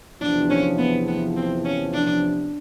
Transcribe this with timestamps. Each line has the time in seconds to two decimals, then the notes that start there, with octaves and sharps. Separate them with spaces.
0.21 E2 C3 F3 D4
0.50 C#4
0.78 B3
1.08 B3
1.36 C4
1.65 C#4
1.94 D4